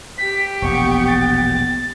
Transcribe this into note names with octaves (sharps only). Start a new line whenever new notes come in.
G4 B6
E1 A#1 B3 C#6
A6